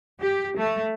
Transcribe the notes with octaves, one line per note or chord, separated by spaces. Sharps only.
G4
A3